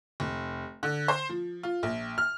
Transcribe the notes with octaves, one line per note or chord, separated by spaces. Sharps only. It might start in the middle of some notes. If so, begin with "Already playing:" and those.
F1
D3
C5
F3
F4
A#1
F6